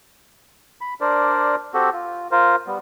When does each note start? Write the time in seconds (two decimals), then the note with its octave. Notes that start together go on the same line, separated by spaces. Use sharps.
0.81 B5
1.01 D4 A#4 C5 D5
1.74 C4 F#4 G4 A4
1.93 F4
2.31 F4 A#4 C5
2.67 G3 B3